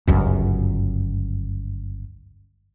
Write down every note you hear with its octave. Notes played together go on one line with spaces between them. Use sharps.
G1 C#2 F#2